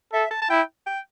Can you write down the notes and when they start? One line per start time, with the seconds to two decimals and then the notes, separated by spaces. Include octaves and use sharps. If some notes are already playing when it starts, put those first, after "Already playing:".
0.13 A4 E5
0.31 A5
0.42 A5
0.50 E4 G5
0.86 G5